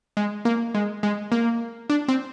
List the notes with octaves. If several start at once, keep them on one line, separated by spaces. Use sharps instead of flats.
G#3
A#3
G#3
G#3
A#3
D4
C4